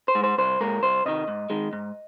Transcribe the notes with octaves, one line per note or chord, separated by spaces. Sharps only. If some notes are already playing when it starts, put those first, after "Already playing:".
C5
G#3
C5
C2 C5
A#2 G#3 A#4
C2 C5
C3 D#3 D#5
G#2
D#3 G#3
G#2